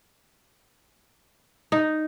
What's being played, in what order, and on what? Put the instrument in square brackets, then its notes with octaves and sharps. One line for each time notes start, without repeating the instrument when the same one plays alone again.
[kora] D#4